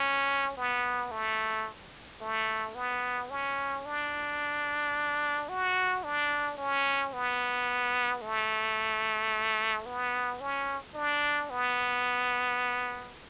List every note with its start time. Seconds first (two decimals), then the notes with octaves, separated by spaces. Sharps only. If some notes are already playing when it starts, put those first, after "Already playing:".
Already playing: C#4
0.57 B3
1.11 A3
2.21 A3
2.75 B3
3.30 C#4
3.85 D4
5.49 F#4
6.04 D4
6.58 C#4
7.13 B3
8.22 A3
9.86 B3
10.40 C#4
10.95 D4
11.50 B3